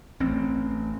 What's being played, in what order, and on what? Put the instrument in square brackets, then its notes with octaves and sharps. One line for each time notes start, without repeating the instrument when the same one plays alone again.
[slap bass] A1 C4